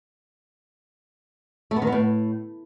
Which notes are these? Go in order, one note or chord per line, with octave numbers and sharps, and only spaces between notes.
A3
B3
D#3
B3
A2